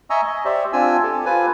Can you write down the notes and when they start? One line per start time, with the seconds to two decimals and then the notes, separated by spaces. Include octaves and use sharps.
0.10 D#5 E5 G#5 A#5 C#6 E6
0.27 D#5
0.45 G4 C5 D5 E5
0.73 C4 D4 F4 G#5 E6
1.03 G4 A4
1.25 F4 B4 C5 G#5